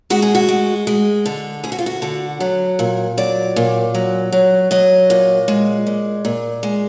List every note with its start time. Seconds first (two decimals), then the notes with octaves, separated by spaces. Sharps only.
0.10 G#3 F#4
0.22 G#4
0.35 F#4
0.49 G#3
0.87 G#3
1.26 D3
1.64 D2 G#4
1.72 F#4
1.79 F4
1.86 F#4
2.02 D3
2.40 F#3
2.79 A#2
3.17 F#3 D5
3.56 A#2
3.94 F#3
4.32 F#3
4.71 F#3 D#5
5.10 A#2
5.48 G#3
5.87 A#2
6.25 A#2
6.63 G#3